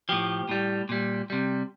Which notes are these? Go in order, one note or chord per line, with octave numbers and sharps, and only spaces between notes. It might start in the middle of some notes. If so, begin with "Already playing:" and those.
A2 F3 G4
A2 G3
A#2 G3
C3 G3